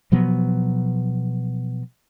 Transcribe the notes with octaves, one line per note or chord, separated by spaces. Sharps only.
B2 F3 F#3 B3